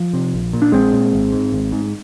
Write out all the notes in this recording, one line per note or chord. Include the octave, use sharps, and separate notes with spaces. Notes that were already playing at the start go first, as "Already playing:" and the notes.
Already playing: F3
C3
A#1
A#2
D4
A#1 G#3 C4
A#2
G#1
G#2
G#1
G#2